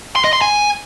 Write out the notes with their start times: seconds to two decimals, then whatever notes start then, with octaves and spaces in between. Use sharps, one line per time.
0.16 C6
0.24 D#5
0.33 C6
0.41 G#5